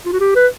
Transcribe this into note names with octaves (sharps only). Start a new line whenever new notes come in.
F4
F#4
G4
B4